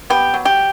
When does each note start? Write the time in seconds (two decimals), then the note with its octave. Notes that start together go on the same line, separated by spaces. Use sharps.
0.10 B3 G4
0.34 F#3
0.45 G4